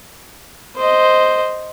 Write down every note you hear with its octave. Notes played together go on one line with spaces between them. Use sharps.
C5 D#5